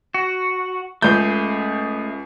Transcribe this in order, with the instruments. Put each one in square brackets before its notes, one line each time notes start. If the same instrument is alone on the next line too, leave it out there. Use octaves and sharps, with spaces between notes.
[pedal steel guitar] F#4
[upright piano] C#2 G6 [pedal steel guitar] A3 G#4